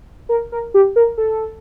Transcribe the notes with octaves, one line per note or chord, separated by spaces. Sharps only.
A#4
A#4
G4
A#4
A4